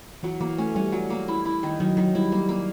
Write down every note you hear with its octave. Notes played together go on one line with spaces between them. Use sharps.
E3 F#3
E3 A#3
A3 C#4
G3 C#4
F#3
A#3
E4
E4
D#3
D#3 F#3
D#3 F#3
G3 E4
G3 A#3
A#3